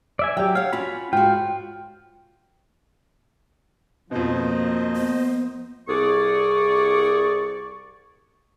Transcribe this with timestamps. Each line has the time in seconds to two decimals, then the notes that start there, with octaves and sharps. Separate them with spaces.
0.19 D5 E5 G#5
0.37 F#3 G4 G5
0.55 C#5 F5 F#5
0.73 C#4 F4 F#4 B5
1.13 G#2 F4 F#4 G5
4.11 F2 B2 F3 A#3 C5 D#5
4.96 B3
5.88 C2 G#4 D5 C#6